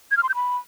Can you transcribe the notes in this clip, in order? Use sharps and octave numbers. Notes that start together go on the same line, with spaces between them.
G#6
F6
C6
G6
B5